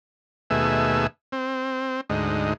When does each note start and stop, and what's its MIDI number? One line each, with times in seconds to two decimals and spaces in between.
0.50 1.07 39
0.50 1.07 47
0.50 1.07 57
0.50 1.07 68
0.50 1.07 76
1.32 2.01 60
2.10 2.53 38
2.10 2.53 44
2.10 2.53 63